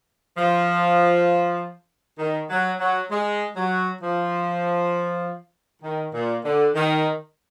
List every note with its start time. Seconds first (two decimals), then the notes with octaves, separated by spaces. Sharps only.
0.37 F3
2.19 D#3
2.50 F#3
2.79 F#3
3.10 G#3
3.56 F#3
4.01 F3
5.82 D#3
6.13 A#2
6.44 D3
6.75 D#3